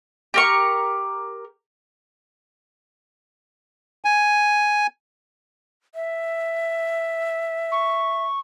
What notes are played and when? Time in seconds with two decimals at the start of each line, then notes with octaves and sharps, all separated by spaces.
0.34 G4 A#4 C#6
4.05 G#5
5.95 E5
7.72 C#6